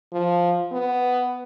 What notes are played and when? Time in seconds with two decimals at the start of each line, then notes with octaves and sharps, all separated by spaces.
0.13 F3
0.72 B3